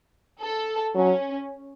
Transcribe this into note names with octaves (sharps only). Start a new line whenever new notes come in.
A4
F#3 C#4